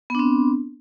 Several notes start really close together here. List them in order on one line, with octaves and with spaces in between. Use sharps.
B3 D4 C4